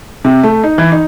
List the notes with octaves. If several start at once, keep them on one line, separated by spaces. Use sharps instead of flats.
C3
A3
D#4
E3
D#4